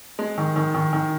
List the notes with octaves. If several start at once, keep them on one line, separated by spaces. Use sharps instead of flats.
G#3
D#3
D#3
D#3
D#3